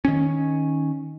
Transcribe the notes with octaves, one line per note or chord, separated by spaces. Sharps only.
D#3 C#4